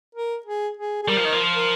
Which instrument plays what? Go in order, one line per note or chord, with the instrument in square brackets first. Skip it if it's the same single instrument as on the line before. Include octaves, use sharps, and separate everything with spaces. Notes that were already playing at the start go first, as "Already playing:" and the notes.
[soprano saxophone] A#4
G#4
G#4
G#4
[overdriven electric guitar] G3 [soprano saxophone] A#4
[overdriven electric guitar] F3
D#3
F3
[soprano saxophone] A#4